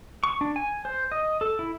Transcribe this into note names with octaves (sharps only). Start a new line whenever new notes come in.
C#6
D4
G#5
C5
D#5
A4
E4